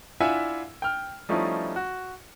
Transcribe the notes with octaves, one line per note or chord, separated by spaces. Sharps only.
D4 E4 F4 E5 F#5 G#5
G5 F6
F3 G3 A3 C#4 D#4 E4
F#4